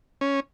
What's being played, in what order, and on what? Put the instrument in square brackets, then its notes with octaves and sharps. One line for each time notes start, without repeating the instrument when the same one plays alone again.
[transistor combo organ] C#4